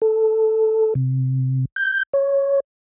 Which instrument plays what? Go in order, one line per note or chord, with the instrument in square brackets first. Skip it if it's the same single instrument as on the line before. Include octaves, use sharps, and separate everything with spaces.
[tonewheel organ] A4
C3
G6
C#5